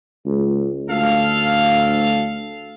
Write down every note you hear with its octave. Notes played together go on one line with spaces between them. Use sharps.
C#2
D2 A4 F5